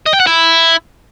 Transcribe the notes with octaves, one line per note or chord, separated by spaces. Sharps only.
D#5
G5
F#5
E4